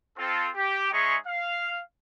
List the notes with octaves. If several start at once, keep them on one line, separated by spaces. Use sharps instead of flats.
C4 F4 A4
G4
G#3 D#4 G#4 C#5 E5 C#6
F5